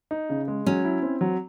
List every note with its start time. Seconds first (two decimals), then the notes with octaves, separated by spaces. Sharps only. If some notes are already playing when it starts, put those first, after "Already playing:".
0.11 D#4
0.30 C#3
0.48 G#3
0.66 F#3 C#4
0.85 E4
1.02 C4
1.21 F#3